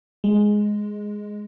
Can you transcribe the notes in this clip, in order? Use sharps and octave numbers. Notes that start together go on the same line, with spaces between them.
G#3